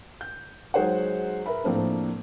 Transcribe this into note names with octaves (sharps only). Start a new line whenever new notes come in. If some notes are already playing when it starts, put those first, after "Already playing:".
G6
F#3 G#3 D#4 C5 C#5 F#5
A#4 B4 E5 B5
A2 F3 A#3 C4 D4